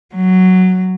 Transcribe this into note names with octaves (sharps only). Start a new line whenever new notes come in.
F#3